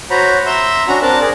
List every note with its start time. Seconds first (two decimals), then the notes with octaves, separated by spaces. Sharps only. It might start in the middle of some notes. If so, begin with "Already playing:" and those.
0.10 F#4 C5 C#5 A#5 B5
0.46 E5 A#5 C6 E6
0.87 C#4 D4 F#4 A#5
1.02 C4 D4 A#4 A5 F#6
1.21 G#4 A#4 D5